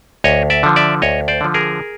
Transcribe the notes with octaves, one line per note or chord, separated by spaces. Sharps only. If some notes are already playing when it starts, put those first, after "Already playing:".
D2 C#5 D#5
D5 E5
D3 F3
D5 E5
D2 C#5 D#5
C5 D5
D3 F3
G#4 A#4